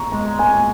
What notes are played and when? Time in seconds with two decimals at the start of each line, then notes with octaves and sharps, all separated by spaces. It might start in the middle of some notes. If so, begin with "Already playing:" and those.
Already playing: A#5 C#6
0.12 G#3 A#5
0.39 G#5